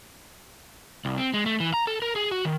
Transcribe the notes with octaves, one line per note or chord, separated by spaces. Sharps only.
C2
C4
G#3
A3
E3
A#5
A4
A#4
G#4
F#4
D#3